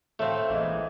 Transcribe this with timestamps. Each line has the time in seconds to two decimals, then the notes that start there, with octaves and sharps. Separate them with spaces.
0.19 A2 A3 C4 F5
0.50 A1 A#2 E3 G#3